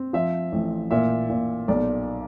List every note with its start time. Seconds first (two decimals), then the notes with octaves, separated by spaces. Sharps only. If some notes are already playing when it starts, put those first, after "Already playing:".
Already playing: C4
0.13 F3 E5
0.52 A1
0.91 A#2 E5
1.29 A#2
1.68 B1 D5